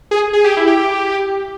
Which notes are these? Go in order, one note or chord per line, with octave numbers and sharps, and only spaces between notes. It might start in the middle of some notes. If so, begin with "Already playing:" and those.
G#4
G#4
G4
E4
G4